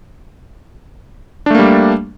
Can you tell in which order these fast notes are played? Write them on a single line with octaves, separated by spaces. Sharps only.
D4 A3 A#3 G3